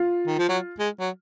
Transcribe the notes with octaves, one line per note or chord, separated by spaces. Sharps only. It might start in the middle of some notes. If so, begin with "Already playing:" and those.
Already playing: F4
D#3
F3
F#3
G#3
F#3